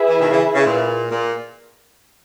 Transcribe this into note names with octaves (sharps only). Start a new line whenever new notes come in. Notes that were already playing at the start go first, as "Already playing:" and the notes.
Already playing: E4 G#4 B4 E5
E3
B2 D#3
C#3 E3
C#3
A#2
A#2